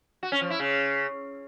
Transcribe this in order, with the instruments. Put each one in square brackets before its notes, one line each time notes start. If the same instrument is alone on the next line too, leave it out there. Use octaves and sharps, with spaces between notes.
[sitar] F#4
C#4
F3
E4
C#3